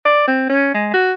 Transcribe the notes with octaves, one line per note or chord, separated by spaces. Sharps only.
D5
C4
C#4
G#3
F#4